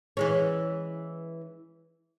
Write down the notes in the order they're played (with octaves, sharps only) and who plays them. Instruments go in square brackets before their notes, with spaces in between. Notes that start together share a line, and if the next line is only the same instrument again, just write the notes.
[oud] E3 G#3 C#4